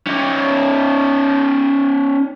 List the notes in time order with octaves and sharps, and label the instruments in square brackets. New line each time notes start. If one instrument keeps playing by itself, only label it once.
[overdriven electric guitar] C#4 D#4